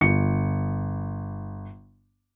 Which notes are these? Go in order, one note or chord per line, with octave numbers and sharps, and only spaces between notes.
G1 C#7